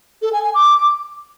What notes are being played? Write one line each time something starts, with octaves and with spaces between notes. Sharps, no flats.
A4
G#5
G#5
D6